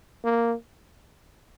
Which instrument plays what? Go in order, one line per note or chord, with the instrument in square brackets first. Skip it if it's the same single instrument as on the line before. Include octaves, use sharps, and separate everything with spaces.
[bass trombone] A#3